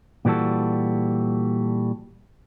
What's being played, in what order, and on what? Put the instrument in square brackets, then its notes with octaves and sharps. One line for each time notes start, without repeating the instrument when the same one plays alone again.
[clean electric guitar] A#2 E3 G3 F#4 A4